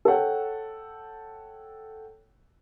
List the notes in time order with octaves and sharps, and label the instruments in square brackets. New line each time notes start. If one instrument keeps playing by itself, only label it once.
[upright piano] A4 C#5 F#5 G5